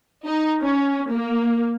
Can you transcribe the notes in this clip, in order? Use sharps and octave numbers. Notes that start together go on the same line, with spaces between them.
D#4
C#4
A#3